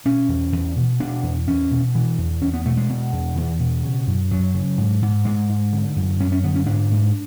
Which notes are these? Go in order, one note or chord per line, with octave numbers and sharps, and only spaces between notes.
B2 C#4
E2
E2
B2
B2 D4
E2
E2 C#4
B2
B2 E3
E2
E2 C#4
B3
B2 A3
G#3
B2
E2
E2 E3
B2
C#3
F#2
F#2 F#3
C#3
G#2
G#2
G#2 G#3
G#2
D3
F#2
F#2 C#4
C#4
D3 B3
C#4
G#2 D4
G#2